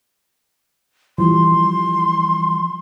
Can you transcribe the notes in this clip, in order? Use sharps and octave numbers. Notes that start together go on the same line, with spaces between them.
E3 F3 G3 C6